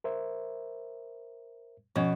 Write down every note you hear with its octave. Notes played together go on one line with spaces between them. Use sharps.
A#4 C5 E5
B2 F3 C#4